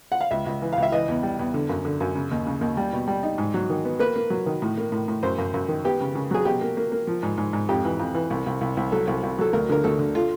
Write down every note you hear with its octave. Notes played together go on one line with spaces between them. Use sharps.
F#5
F5
C#2 E5
C#2
E3
C#2 F5
E5
E3 D#5
E2
G3
E2
D3
F#2
D3
F#2
C#3
D#2
C#3
D#2
G3
B2
G3
D#4
G#2
F#3
D#3
B3
A#3 B4
A#3
F#3
D#3
A2
A#3
A2
A2
F#2 C5
F#2
F#2
D#3
B3 G4
C#3
C#3
F#3 G#4
B2 G4
A#3
A#3
A#3
F3
G#2
G#2
G#2
F2 G4
E3
F2
E3
C2
C2
C2
C2
F#3 A4
C2
C2
F#3 A4
D2 A#4
D3 A#4
D2 A4
D3
A3 F4